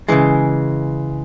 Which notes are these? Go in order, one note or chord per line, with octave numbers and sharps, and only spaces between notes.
C#3 E3 G#3